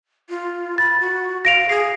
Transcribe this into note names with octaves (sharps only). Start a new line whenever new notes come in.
F4
B5 A6
F#4
F5 A#6 D7 F7
G#4 C7